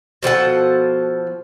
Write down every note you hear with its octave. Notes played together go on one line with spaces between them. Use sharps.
B2 F3 A4 F#5